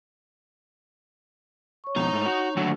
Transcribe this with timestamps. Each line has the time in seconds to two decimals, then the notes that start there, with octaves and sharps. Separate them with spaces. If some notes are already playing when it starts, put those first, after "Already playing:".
1.84 C#5 C#6
1.96 F2 B2 D#4 A#5
2.13 G#2 A3
2.26 F#4
2.57 D#2 D3 F#3 A3 F#4